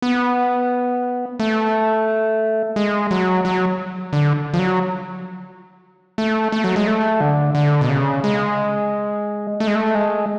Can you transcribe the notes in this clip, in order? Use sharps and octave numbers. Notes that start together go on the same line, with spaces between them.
B3
A3
G#3
F#3
F#3
D3
F3
F#3
A3
A3
F#3
G#3
A3
D3
D3
B2
C#3
G#3
A3
G#3
A3
G#3